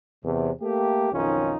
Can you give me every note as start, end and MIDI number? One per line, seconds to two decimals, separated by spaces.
0.24 0.51 40
0.24 0.51 48
0.60 1.12 57
0.60 1.12 58
0.60 1.12 67
1.12 1.56 35
1.12 1.56 41
1.12 1.56 51
1.12 1.56 61
1.12 1.56 63
1.12 1.56 65